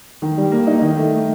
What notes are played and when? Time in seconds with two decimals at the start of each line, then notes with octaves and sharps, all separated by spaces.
0.22 D#3
0.37 G3
0.52 A#3
0.67 D#4
0.82 D#3
0.97 A3